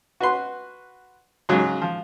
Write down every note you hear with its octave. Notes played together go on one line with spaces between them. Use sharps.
F#4 B4 C6
G#2 C#3 F#3
F3